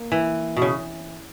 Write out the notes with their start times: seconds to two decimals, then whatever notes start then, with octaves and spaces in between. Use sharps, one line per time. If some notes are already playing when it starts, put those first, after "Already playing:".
Already playing: A#3
0.12 E3
0.57 B2
0.62 C#3